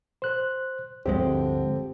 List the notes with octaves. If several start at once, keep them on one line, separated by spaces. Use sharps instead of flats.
C5 F#6
D1 G2 D3 F3 G#3 C4 G4